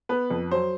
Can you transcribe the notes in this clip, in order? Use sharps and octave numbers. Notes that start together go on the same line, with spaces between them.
B3 B4
F2
F#3 C5